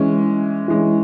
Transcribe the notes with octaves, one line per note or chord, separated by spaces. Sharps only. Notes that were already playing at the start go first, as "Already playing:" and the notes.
Already playing: E3 G#3 C#4
E3 G#3 C#4